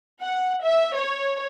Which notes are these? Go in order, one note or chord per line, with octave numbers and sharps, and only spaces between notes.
F#5
E5
C#5